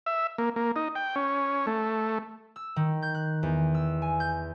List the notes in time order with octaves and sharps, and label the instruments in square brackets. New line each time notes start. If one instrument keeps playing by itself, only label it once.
[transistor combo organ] E5
A#3
A#3
D#4
G5
C#4
A3
[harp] E6
D#3
G6
F#6
E2
E6
G#5
G6